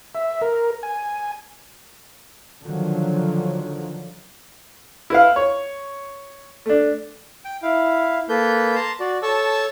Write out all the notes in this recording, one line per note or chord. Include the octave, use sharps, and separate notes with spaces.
E5
A#4
G#5
D3 D#3 F3 F#3
E4 B4 F5
C#5
A3 D4
G5
E4 F5
A#3 A4 B4 G6
A5 A#5 C6
F#4 D5
A4 C#5 A5 C#6 E6